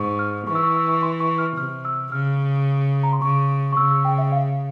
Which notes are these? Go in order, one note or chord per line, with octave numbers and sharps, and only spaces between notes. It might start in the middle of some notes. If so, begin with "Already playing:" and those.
Already playing: G#2 C#6
F6
E3 C#6
E6
C#6
E6
C#6
C6
C#6
F6
C3 F6
E6
C#3 F6
A#5
C6
C#3 C#6
C#6
C#3 E6
E6
G5
E5
F5